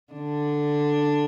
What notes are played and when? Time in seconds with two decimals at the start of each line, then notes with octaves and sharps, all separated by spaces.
0.13 D3 D4